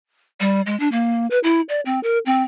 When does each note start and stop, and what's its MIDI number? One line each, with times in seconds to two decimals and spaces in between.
0.40 0.61 55
0.66 0.78 56
0.80 0.88 62
0.92 1.27 58
1.30 1.39 71
1.43 1.61 64
1.69 1.80 74
1.85 1.99 60
2.03 2.18 70
2.26 2.42 60